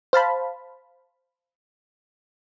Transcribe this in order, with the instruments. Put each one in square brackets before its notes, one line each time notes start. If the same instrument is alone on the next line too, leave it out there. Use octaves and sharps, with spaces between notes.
[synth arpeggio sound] C5 F5 A5 B5